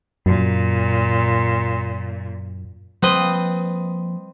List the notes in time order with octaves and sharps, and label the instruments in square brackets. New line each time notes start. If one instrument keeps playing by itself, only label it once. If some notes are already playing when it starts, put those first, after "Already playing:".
[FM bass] F#2 [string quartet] A#2
[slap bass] F3 G3 A#3 [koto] C4 B4 D#5